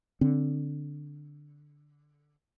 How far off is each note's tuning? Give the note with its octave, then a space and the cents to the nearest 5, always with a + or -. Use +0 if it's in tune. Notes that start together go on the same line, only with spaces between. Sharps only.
D3 +0 C4 +0